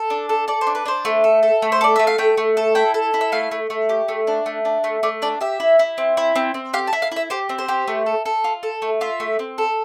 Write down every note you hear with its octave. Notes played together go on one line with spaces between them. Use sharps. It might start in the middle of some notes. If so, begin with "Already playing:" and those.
Already playing: A4
D4
A4
A4 D5
C5
D4
B4
D4 C5
A3
A4
A4
A3
C5
A4 D5
A3 E5
F5
A3 G5
A3
A4
E4 G5
A4
E4
E5
A3 F5
A3
A3
G4
A3
D4
A3
D4
A3
A3 D5
D4 D5
G4 E5
E4
E4
C4
E4
C4
C4
G4 F5
A5
E4
F5
E4 E5
G4 C5
C4
C5
G4
A3
A4
A4
F4
A4
A3
F4 E5
A3
C4
A4